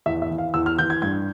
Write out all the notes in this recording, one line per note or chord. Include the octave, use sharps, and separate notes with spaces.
E2 E5
E5
E3
F5
E2 E6
F6
E3 G6
G#6
G2 G#6